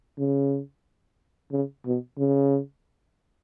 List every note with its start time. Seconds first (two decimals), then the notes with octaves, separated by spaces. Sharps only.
0.19 C#3
1.52 C#3
1.86 B2
2.18 C#3